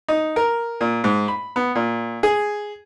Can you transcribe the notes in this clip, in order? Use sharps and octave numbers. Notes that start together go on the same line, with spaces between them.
D#4
A#4
A#2
G#2
B5
B3
A#2
G#4